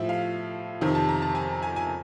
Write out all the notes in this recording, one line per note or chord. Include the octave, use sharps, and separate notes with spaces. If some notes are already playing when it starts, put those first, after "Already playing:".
Already playing: A2 F3 E5
F5
F2 C3 D#3
A5
A#5
A5
G#5
G#5
G#5